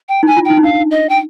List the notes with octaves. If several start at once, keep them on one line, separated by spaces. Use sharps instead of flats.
G5
D#4
G#5
F4
D#4 G5
D#4
D4 F5
D#5
G5